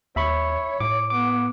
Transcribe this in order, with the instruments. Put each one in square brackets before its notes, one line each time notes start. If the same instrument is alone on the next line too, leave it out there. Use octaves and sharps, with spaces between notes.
[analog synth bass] D#2 [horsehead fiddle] C#5 [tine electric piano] E5 B5 C#6
[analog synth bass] A2 [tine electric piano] D6
[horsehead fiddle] B3 [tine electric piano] D6